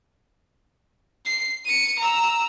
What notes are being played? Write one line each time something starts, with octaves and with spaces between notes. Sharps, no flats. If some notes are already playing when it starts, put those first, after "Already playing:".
C7
C#7 D#7
A#5 E6